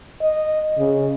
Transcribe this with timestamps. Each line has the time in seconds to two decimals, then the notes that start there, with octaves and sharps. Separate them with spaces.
0.22 D#5
0.78 C#3